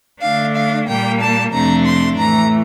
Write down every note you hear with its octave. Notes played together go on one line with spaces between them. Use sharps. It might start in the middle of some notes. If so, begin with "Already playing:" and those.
D3 A3 D4 F5
F5
A#2 G3 A#3 G5
A5
F2 C3 F3 A3 D4 A#5
C6
A2 E3 A3 A#5